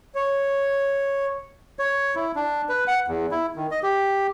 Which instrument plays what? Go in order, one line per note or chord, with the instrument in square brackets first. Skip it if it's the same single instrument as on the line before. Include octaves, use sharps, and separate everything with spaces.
[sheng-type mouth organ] C#5
[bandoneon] C#5
E4
D4
B4
F#5
E2
E4
D#3
D#5
G4